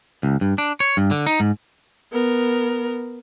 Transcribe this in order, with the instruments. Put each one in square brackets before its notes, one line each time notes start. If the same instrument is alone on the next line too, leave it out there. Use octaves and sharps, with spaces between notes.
[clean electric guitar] C#2
G2
D4
C#5
G2
D3
D#4
G#2
[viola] B3 A#4